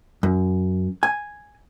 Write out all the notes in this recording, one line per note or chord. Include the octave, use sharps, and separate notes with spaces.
F#2
G#5